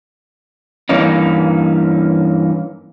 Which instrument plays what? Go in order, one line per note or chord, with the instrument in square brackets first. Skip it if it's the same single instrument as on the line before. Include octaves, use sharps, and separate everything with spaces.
[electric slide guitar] G2 E3 A#3 C#4 D#4